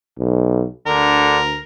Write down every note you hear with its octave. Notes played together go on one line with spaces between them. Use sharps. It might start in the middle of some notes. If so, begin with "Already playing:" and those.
B1
D2 D3 A#4